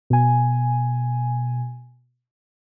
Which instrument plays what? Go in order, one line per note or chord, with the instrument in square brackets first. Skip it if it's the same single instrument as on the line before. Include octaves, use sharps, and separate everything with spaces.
[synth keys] B2 G#5